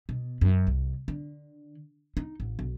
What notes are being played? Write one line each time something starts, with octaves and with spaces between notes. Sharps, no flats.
B2
F#2
C2
D3
D#4
A1
B1